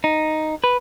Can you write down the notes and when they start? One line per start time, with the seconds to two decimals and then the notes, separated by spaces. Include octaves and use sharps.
0.04 D#4
0.64 B4